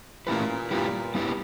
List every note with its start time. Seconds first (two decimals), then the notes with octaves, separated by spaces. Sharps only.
0.27 A#2 A3 C#4 E4 G4 B4
0.70 A#2 G3 B3 E4 G4 B4
1.15 G3 B3 E4 G4 B4